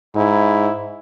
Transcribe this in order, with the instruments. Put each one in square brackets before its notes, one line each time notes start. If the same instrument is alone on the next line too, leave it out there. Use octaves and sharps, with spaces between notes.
[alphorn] G#2 [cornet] E4